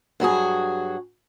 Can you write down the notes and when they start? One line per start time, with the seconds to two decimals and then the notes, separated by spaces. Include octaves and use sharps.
0.20 G2 F#3 F#4 G#4